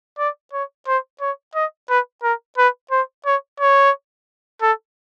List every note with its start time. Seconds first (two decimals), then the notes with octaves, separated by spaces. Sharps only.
0.18 D5
0.53 C#5
0.87 C5
1.21 C#5
1.55 D#5
1.89 B4
2.23 A#4
2.58 B4
2.91 C5
3.26 C#5
3.60 C#5
4.62 A4